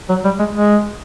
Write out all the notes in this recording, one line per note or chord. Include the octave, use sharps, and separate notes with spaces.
F#3
G3
G#3
G#3